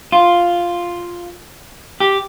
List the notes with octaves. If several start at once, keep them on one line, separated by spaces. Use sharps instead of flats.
F4
G4